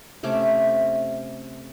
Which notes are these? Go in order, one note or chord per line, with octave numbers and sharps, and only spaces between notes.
C3 A3 C#4 D6